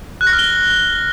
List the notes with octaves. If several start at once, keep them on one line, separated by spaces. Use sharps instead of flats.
F#6
A#6
F6
G7